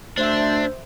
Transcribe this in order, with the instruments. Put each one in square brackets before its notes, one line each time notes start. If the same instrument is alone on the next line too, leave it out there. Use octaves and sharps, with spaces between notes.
[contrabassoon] D2 [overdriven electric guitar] D4 [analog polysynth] C5 E5